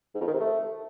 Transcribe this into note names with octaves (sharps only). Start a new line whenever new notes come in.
G#2
F2
D#3
C3
A3